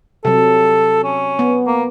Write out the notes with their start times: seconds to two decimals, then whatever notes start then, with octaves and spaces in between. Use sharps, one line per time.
0.25 C3 F#3 A4
1.04 C#4
1.39 B3
1.67 A#3